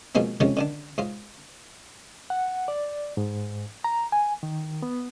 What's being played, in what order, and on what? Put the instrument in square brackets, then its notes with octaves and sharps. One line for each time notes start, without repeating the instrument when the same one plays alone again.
[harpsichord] B2 F3 G#3 A#3 C4
C3 D#3 F3 G#3 C#4
D3 D#3 D4
G#2 F4
[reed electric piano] F#5
D5
G#2
A#5
G#5
D#3
B3